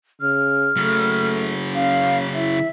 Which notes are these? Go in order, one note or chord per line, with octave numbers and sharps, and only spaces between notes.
C#3 F6
C#3 F#3 A3
C#4 F5
E4 E5